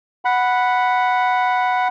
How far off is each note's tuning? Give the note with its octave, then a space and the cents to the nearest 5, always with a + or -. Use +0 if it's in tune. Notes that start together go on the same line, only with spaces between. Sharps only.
F#5 +0 B5 +0